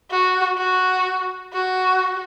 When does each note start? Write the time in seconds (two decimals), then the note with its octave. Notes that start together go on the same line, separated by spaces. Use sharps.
0.11 F#4
0.58 F#4
1.53 F#4